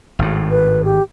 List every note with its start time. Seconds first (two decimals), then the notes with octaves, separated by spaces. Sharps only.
0.19 G#1 A2
0.51 B4
0.84 G4